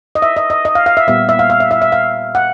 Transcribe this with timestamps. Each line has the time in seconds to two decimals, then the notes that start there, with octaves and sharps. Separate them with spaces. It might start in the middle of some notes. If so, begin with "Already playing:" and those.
0.15 D#5
0.22 E5
0.36 D#5
0.50 D#5
0.65 D#5
0.75 F5
0.86 F5
0.97 E5
1.07 A#2 G3 B3 E5
1.29 E5
1.39 F5
1.50 F5
1.60 E5
1.71 E5
1.82 E5
1.92 F5
2.35 F#5